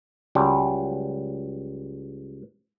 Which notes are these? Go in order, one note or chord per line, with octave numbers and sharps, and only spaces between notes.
C#2 F#3 G3